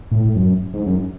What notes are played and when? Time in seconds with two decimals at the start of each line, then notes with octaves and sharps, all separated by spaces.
0.11 A2
0.36 F#2
0.74 G#2
0.86 F#2